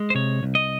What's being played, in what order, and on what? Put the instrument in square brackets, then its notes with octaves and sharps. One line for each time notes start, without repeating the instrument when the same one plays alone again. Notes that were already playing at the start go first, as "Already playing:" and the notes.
Already playing: [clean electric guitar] G#3
C5
C3 C#5
C2
D#5